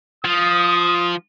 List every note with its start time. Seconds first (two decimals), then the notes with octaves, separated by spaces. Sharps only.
0.25 F3 D#6